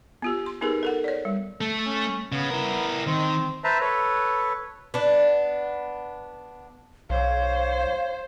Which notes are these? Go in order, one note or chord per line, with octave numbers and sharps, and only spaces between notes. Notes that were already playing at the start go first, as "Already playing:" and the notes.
B3 F4 G4
C6
B3 D#4 G4 G#4 A#4 B4
A4 A#4 F#5
C#5 D5
G3
A3 A4
C#4
C#3 B3
E4 A#4
D#3 C4
B4 C5 E5 A5 A#5
A4 B4 C#5
B3 D4
B1 C5 C#5 F5